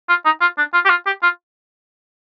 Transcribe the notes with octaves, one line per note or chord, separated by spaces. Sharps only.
F4
D#4
F4
D4
F4
G4
F4
G4
F4